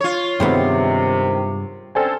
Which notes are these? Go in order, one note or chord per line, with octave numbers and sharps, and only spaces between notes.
F4 C#5
G2 C3 D#3 G#3 B3 C4
D3 C4 C#4 A4 C5 G#5